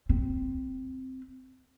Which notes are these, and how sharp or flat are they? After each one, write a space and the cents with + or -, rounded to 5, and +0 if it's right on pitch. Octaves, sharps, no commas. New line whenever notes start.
C4 -5